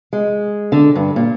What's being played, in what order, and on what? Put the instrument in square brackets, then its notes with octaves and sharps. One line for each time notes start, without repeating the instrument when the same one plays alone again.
[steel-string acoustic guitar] G#3
D3
G2
A#2